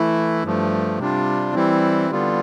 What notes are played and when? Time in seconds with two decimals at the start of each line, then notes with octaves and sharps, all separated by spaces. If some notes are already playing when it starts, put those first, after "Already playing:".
Already playing: E3 A3 E4
0.44 G2 F3 A3
0.99 C3 G3 D4 F4
1.55 E3 G3 C4 E4
2.11 D3 G3 B3 F4